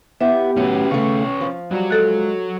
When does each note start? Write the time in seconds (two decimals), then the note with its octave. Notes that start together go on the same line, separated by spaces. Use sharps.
0.21 B3 E4 G4 E5
0.57 A2 F#3 C#4 B4
0.91 C#3 A3 C#6
1.41 F3
1.71 F#3 G3 F#4
1.90 G#3 A4 F#6